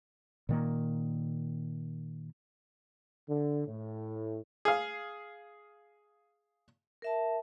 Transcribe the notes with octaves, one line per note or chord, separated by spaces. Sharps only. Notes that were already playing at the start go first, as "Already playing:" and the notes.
A#2 D#3 A#3
D3
A2
G#4 F5
A#4 E5 A5